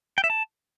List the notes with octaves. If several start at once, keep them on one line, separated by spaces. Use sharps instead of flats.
G5
E5
A5